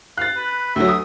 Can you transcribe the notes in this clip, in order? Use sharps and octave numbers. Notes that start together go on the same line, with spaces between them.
F5 F#6 A6
B4
D2 F#3 E5
D#6